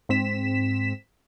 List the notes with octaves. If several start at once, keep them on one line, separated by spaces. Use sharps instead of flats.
G#2 C4 B6 E7